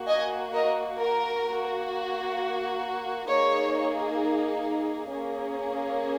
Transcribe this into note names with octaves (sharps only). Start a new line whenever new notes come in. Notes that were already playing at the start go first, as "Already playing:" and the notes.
Already playing: A#3 F#4
D#5 G#5
A#4 D#5
A#4
A#3 F#4
A#3 D#4 G#4 C#5
A#3 C#4 G#4